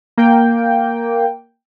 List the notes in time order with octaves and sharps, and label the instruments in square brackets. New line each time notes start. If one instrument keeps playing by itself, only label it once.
[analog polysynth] A#3 G5